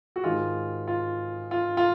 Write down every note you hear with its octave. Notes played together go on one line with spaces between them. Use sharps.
F#4
G#2 D#3 G#3 F4
F4
F4
F4